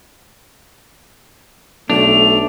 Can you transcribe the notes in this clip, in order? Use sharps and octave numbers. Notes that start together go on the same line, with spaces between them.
B1 A3 D4 F7